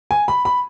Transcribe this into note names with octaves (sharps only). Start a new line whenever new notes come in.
G#5
B5
B5